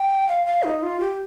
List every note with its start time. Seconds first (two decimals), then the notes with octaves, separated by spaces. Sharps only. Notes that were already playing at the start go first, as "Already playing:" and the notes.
Already playing: G5
0.29 F5
0.46 F5
0.63 D#4
0.83 F4
1.00 G4